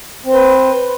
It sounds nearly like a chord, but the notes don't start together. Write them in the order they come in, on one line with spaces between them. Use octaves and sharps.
C4 C5 B4